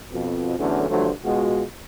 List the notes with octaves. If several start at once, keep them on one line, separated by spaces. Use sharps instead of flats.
F2 B2
E2 D3 E3 F#3 A3 C#4
G2 D3 F3 F#3 A3 C5
C#2 B2 G#3 F4 F#4